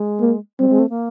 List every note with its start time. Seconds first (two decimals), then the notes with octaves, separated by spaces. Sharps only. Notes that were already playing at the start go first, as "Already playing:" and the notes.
Already playing: G#3
0.20 A#3
0.59 G3 C4
0.70 G#3
0.79 A3
0.90 A#3